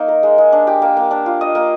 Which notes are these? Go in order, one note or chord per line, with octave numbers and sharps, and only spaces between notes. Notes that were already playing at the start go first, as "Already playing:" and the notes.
Already playing: A#3 D#4
A#4
G#3
G#3
D4
G4
A#3
A#3
D4
F4
D#5
A#3